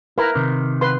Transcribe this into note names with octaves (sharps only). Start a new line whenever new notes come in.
E4 A#4 B4 A#5
C3 D#3
B4 C6